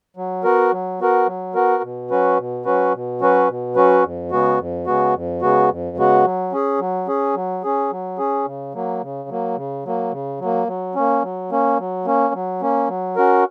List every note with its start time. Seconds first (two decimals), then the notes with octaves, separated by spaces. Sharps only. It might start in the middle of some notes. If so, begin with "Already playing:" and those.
0.16 F#3
0.43 B3 F#4 A#4
0.72 F#3
1.00 B3 F#4 A#4
1.27 F#3
1.54 B3 F#4 A#4
1.83 B2
2.11 F#3 C#4 F#4 B4
2.38 B2
2.65 F#3 C#4 F#4 B4
2.94 B2
3.20 F#3 C#4 F#4 B4
3.49 B2
3.75 F#3 C#4 F#4 B4
4.04 F2
4.31 C#3 G#3 B3 F#4
4.59 F2
4.87 C#3 G#3 B3 F#4
5.14 F2
5.42 C#3 G#3 B3 F#4
5.70 F2
5.97 C#3 G#3 B3 F#4
6.25 F#3
6.52 C#4 G#4
6.80 F#3
7.08 C#4 G#4
7.35 F#3
7.64 C#4 G#4
7.91 F#3
8.18 C#4 G#4
8.46 C#3
8.74 F#3 A#3
9.02 C#3
9.29 F#3 A#3
9.56 C#3
9.85 F#3 A#3
10.12 C#3
10.40 F#3 A#3
10.68 F#3
10.95 A#3 C#4
11.23 F#3
11.51 A#3 C#4
11.79 F#3
12.05 A#3 C#4
12.34 F#3
12.61 A#3 C#4
12.89 F#3
13.16 C#4 F#4 A#4